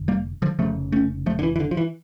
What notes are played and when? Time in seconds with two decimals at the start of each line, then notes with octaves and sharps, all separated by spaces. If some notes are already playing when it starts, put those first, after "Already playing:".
Already playing: F1 D3
0.08 G3 A#3
0.42 D3 F3
0.59 F1 F2 C#3 F3 A3
0.92 A3 C#4
1.26 F3 A3
1.39 D3
1.43 E3
1.56 E3
1.60 D3
1.71 F3
1.77 E3